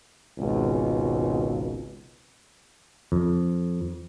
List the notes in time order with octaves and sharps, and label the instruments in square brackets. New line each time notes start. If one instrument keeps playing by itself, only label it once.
[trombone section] G#1 C#2 B2
[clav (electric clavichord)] F2